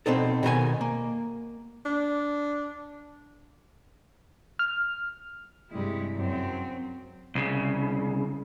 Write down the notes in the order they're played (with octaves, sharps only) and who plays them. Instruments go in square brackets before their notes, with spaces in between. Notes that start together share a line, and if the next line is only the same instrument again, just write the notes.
[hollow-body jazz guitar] B2 C4 D#4 A4
B2 D#3 A#4 G#5
A#3
[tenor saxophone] D4
[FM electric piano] F6
[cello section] G2 C3 G3 G#3 E4
F#2 C4
[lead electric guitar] C2 C#3